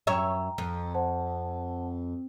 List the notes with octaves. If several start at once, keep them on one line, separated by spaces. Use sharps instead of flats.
F#2 C#5 E5 G5 A#5
F2
C5 F#5 A5